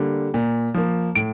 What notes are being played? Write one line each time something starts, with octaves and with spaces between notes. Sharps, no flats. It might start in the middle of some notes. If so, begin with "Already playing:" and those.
Already playing: D3 G3 A#3
A#2
F3 A#3
A2 D7